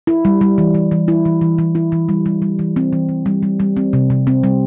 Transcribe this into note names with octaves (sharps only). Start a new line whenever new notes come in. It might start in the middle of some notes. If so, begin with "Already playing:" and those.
E4
G3
G3
E3
E3
E3
E4
E3
E3
E3
E4
E3
G3
G3
G3
E3
C4
E3
E3
G3
G3
G3
C4
C3
C3
C4
G3